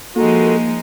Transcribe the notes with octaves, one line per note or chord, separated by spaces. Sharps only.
F3 G#3 A#3 D#4 F#4 A4